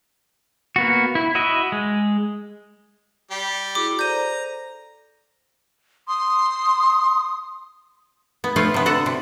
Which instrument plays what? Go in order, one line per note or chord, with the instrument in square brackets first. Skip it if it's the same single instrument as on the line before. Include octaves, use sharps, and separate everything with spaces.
[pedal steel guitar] A#3 B3 F#4
E4
E4 F#4 D#5 E5
G#3
[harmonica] G3 G4
[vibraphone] E4 F#4 G#4 [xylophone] D6
[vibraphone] A4 C5 D5 [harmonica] A#5 [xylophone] G6 D#7
[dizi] C6 [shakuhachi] D#6
[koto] B3
F3 A3 F4 B4 C#5 F5
C3 B3
D3 F#4 A4 F#5
C3